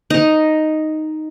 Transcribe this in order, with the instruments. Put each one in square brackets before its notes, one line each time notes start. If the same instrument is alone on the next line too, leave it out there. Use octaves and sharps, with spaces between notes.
[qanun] D#4